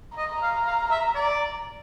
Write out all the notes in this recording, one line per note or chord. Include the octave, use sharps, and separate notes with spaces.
D#5 A#5
F5
F5
E5
D5